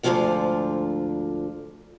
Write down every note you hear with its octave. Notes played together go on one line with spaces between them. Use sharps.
D2 G#2 D3 F3 F4 F5